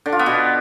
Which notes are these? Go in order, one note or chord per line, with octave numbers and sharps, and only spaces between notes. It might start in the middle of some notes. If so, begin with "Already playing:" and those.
D3
F4
B3
B2